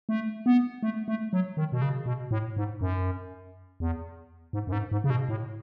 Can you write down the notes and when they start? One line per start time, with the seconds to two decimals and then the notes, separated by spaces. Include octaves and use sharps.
0.09 A3
0.46 B3
0.83 A3
1.08 A3
1.33 F#3
1.57 D#3
1.72 B2
1.82 C#3
2.06 B2
2.31 A2
2.57 G#2
2.81 F#2
3.80 E2
4.53 G#2
4.67 F#2
4.72 G#2
4.92 G#2
5.04 C#3
5.10 B2
5.29 A2